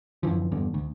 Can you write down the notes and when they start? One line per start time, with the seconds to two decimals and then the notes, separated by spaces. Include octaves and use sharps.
0.23 F#2 D3 E3 F3
0.52 G1 E2 G2 D3
0.74 D2